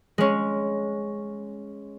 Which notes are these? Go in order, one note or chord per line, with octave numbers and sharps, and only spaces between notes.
G#3 C#4